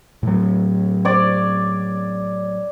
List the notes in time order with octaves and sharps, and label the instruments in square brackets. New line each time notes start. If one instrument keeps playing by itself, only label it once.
[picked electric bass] A2 F#3
[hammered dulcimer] C#5 D5 D6